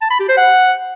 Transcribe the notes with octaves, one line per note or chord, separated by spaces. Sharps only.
A5
B5
G4
C5
F#5